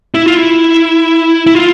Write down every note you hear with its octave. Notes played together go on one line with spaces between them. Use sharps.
E4
F4
E4
E4
F4